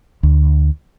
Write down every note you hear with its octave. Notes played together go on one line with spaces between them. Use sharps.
D2